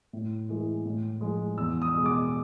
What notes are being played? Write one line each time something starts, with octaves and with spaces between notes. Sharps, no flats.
A2
E3 G#3
A2
F3 G#3
E2 E6
D#6
B2 G#3
D6